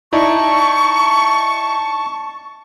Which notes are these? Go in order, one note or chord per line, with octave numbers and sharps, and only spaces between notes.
D#4 E4 D5 A5 C#6